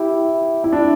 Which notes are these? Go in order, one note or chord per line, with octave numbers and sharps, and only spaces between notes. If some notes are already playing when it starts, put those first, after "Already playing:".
Already playing: E4 G4
E4
D4